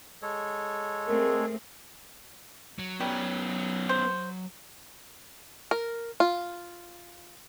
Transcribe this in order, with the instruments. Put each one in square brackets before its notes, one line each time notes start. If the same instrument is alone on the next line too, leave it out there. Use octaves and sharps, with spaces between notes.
[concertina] G#3 A4 C#5
[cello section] A3 C4 G#4 [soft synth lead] A#4
[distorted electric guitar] F#3
[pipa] G3 [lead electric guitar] B3 C#4
[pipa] C5
[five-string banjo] A#4
F4